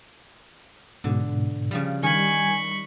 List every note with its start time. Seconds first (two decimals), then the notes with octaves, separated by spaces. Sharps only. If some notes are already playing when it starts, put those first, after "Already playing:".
1.04 G#2 B2 D3
1.71 C#3 F3 G3
2.03 D#3 G3 G#5 B5 C#6